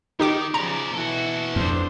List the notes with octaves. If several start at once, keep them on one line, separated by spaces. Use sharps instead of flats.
D#3 D#4 G4 D6
C#3 F3 C#4 D5 A#5
B2 E3 E4 F#4 A4
F2 D4 C5